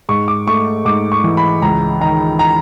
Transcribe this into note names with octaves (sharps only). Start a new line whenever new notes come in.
G#2 C#6
D6
A3 C#6
G#2 D6
C#6
E3
B5
C#2 A#5
D#3 A#5
A#5